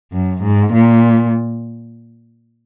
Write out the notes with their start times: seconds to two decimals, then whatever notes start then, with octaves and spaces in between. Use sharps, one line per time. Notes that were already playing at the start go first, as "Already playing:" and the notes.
0.12 F#2
0.43 G#2
0.73 A#2